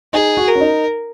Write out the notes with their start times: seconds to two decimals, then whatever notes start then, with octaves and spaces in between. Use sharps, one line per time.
0.13 D#4 G#4
0.37 F#4
0.48 A#4
0.55 C#4
0.60 D#4